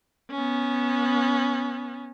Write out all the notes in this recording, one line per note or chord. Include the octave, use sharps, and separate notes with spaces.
B3 C#4